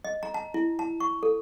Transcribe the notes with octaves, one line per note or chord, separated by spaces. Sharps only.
D#5
A#5
A5
E4
A5
C#6
A4